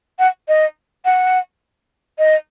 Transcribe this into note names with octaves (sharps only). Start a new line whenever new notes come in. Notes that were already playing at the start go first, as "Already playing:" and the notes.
F#5
D#5
F#5
D#5